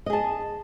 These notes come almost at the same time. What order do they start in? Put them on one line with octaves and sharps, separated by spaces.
D#5 G#4 A5